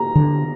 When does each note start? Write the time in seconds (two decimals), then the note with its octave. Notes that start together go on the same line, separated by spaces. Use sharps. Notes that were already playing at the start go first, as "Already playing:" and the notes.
Already playing: A#5
0.15 D3